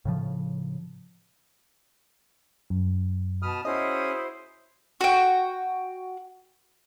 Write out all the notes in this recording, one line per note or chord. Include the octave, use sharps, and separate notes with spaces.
A2 C#3 F3
F#2
B2 A5 B5 D#6 F6
C#4 E4 F#4 G#4 C5 D#5 D#6
F#4 G5